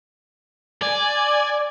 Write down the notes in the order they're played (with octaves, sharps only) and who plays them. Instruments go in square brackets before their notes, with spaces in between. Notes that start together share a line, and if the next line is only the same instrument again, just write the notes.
[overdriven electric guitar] D5 [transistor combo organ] G#5